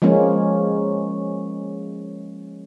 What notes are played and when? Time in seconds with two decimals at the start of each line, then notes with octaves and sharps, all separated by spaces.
0.02 F3 G#3 A#3 C#4